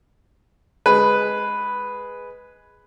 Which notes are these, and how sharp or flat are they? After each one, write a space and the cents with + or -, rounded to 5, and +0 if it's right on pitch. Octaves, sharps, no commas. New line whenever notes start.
G#3 +0 B4 +0